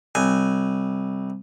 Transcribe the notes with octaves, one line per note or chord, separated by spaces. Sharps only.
C2 G#5